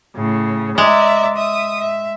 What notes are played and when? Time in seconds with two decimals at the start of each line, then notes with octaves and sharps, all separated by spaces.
0.16 A2 C#3
0.78 G#3 D5 E5 A#5
1.35 E5 D#6
1.80 E5